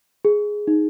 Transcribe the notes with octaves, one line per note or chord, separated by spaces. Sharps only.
G#4
D#4